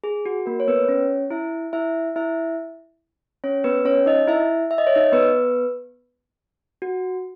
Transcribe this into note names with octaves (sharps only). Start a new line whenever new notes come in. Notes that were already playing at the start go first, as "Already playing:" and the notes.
G#4
F#4
A#3 A#4
C#5
B3 B4
C#4 C#5
E4 E5
E4 E5
E4 E5
C#4 C#5
B3 B4
C#4 C#5
D#4 D#5
E4 E5
E5
D#5
C#5
D#4 D#5
B3 B4
F#4